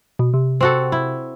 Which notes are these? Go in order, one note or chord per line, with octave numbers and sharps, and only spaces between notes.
B2
C3
C4 F#4 A4
E4